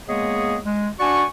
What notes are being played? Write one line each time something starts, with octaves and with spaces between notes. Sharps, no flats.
G#3 A#3 B3 G#4 C#5 D#5
G#3
D4 F#4 D5 G#5 C#6